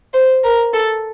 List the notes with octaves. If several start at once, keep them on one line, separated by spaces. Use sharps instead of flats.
C5
A#4
A4